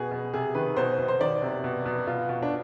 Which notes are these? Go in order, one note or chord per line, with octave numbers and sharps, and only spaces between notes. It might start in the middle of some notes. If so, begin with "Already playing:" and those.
Already playing: B2 G#4
B2
C3 G#4
D#3 B4
B2 C5
B2
C5
D#3 D5
C3
B2
B2
B2 F4
B2
D4